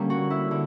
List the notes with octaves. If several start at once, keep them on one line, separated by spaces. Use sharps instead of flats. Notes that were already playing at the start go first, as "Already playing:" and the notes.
Already playing: D3 G3 A#3 C#4
F#4
E4
D3